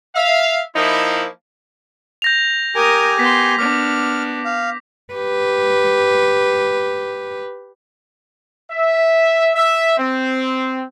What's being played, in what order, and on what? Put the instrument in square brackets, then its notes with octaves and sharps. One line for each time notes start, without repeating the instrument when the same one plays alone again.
[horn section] E5 F5
F3 A#3 D#4 E4
[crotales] G6 A#6 F7
[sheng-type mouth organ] G4 G#5 [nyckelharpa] A#4 D#6
[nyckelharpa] B3 C6 [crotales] B6
[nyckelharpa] B3 D4 [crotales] D6 [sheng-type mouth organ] F6
[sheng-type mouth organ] F5
[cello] G4 B4
[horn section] E5
E5
C4